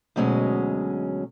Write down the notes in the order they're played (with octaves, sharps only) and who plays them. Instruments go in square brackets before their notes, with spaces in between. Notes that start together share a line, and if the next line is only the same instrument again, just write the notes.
[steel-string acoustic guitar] D2 B2 F#3 G#3 C#4